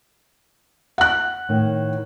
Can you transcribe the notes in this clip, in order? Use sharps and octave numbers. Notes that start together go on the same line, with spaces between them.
F#5 F#6
A2 D#3